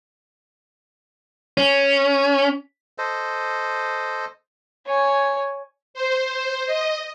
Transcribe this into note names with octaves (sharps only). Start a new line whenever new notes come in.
C#4
A4 C5 D#5
C#5 G#5
C5
D#5